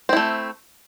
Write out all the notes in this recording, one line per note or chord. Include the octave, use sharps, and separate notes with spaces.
A3 C4 E4